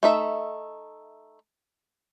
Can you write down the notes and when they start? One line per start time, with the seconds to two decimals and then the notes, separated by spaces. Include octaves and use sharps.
0.03 A3 D#4 E5